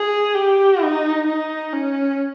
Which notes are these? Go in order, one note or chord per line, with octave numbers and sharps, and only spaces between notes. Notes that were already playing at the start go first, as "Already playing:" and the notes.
Already playing: G#4
G4
D#4
D#4
C#4